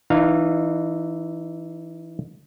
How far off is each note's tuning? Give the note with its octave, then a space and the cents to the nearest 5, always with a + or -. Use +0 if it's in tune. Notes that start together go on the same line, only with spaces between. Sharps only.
E3 +0 D#4 -30 F5 +0